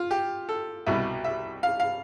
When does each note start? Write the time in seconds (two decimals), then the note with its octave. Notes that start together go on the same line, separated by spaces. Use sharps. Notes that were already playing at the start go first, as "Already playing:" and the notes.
Already playing: F4
0.11 G4
0.49 A4
0.86 C2 B2 G3 E5
1.24 E5
1.63 F5
1.80 F5